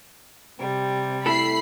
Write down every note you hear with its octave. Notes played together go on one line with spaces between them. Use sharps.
C3 G3
A3 E4 A4 B5 C7